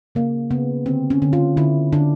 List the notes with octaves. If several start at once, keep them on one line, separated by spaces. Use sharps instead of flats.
C#3 A#3
C#3 B3
D3 C4
C#4
D3
F4
D3 E4
D3 D4